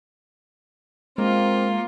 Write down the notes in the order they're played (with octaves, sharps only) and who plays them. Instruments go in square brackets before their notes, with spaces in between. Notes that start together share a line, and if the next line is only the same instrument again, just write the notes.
[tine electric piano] G#3 [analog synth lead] A#3 [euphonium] C4 [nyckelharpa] F4